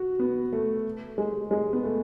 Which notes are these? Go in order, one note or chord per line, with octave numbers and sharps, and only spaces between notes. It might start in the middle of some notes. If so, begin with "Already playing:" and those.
Already playing: F#4
B3
A3
G#3
G#3
B3
A3